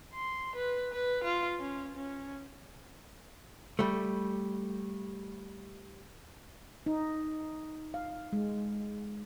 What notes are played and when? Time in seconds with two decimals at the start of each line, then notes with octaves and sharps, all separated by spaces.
0.14 C6
0.56 B4
0.93 B4
1.24 F4
1.59 C#4
1.95 C#4
3.79 G3 A3
6.86 D#4
7.94 F5
8.33 G#3